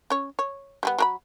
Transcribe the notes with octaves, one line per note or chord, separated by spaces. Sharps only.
C#4 C#5
C#5
G3 G#3 B3
F#3 A#4 B5